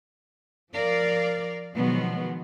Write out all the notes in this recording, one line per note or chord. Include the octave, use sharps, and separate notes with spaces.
F3 A#4 D5 F5
B2 D#3 F3 F#3 G#3 B3